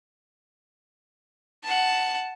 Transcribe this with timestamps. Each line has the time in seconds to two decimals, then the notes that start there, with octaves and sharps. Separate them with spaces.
1.64 F#5 A5